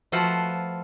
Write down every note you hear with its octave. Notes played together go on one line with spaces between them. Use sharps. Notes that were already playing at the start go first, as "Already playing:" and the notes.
F3 A3 F4 F#4 B4 C5